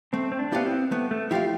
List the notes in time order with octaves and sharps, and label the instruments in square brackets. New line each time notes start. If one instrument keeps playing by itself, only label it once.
[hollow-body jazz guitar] A3 [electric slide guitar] C4
[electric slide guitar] C4
D4
[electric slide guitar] B3 [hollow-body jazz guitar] E4 G4 D5 F5
[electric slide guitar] C4
[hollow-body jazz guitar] A3 [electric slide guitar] B3
[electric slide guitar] A3
[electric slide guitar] F3 [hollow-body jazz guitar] E4 G4 D5 F5